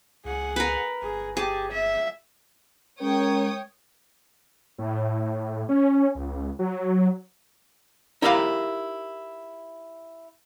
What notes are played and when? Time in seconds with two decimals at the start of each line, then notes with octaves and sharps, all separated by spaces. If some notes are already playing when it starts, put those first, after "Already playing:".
0.25 C#2 G#4 F#5
0.56 A#4 B4
1.02 G1 G#4
1.37 G4 G#4 A5
1.71 E5
3.01 G#3 C#4 A#4 C#5 G5 D#6
4.78 A2
5.69 C#4
6.15 C#2
6.59 F#3
8.22 D#4 E4 G4 A#4 C5 F5